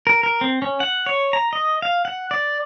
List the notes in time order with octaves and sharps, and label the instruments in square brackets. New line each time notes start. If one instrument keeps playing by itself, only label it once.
[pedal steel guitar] A#4
A#4
C4
C#4
F#5
C#5
A#5
D#5
F5
F#5
D5